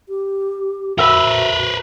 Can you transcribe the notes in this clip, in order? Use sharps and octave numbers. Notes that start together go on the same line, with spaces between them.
G4
F#4 A#4 B4 E5